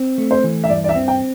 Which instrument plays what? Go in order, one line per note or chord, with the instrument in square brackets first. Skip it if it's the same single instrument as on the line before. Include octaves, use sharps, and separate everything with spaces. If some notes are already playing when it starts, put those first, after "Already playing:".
Already playing: [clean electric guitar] C4
A3
[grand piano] C5
[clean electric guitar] E3
[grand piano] E5
[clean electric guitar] G2 [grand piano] D5
[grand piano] D5
E5
[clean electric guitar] C4
[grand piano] G5